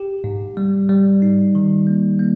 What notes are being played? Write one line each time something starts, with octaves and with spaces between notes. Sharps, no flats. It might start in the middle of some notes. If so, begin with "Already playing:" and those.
Already playing: G4
G#2
G3
G3
D#4
D#3
A#3
A#3